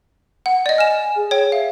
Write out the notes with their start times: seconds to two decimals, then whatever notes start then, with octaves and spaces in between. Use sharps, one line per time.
0.46 F#5
0.66 D5 D#5
0.78 G#5 F6 E7
1.16 G#4
1.31 C#5 G5
1.52 E5 F5